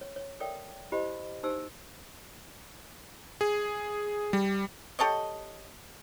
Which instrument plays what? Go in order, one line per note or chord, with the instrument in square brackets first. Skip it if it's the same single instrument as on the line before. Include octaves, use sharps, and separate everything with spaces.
[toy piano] C#5
C#5
A4 A#4 C#5 D5 E5 G5
E4 G4 C5 D#5 B5
D#4 G4 C5 G#5 A5 E6
[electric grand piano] G#4
G3
[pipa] G4 A4 C#5 D#5